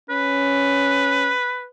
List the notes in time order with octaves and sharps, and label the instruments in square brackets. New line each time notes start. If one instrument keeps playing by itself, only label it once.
[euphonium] C#4 [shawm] B4